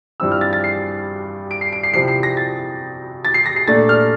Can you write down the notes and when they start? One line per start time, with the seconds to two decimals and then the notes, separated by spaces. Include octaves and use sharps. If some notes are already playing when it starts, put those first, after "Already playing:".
0.20 G2 F3 C4 E4 E6
0.32 F6
0.41 A6
0.53 A6
0.64 C7
1.51 D7
1.61 C7
1.72 D7
1.83 C7
1.93 C3 F3 C4 E4 C7
2.08 C7
2.23 A#6
2.37 A6
3.25 A6
3.34 C7
3.46 A#6
3.56 C7
3.68 A#2 A3 D4 A6
3.89 F6